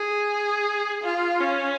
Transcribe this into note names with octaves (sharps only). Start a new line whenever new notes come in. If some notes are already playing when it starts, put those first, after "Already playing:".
Already playing: G#4
F4
C#4